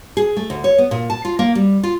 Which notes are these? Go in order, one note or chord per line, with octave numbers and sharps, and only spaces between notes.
G#4
A3
D2
C#5
B3
A#2
A5
F4
A#3
G3
F4